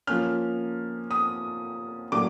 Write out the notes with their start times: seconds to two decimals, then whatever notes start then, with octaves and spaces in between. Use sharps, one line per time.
0.07 F3 A#3 C#4 F6
1.11 D#6
2.12 A2 F#3 A#3 D4 D6